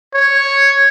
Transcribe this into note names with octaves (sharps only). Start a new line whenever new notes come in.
C#5